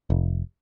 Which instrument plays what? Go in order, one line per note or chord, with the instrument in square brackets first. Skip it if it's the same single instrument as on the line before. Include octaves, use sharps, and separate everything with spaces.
[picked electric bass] F1